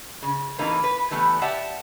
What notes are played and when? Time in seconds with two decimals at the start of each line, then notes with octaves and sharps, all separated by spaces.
0.23 C#3
0.58 A2 C3 E3 A#3 C#4 D#4
0.84 B4
1.11 E3 G3 A3 B3
1.42 G4 D5 E5 F#5 A5